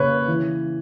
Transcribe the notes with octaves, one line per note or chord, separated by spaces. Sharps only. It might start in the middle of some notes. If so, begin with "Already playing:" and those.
Already playing: C#3 A#3 B4 C#5
E3